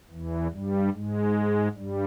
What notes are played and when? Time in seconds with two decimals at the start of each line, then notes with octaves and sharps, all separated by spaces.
0.10 E2 E3
0.52 G2 G3
0.94 G#2 G#3
1.76 G2 G3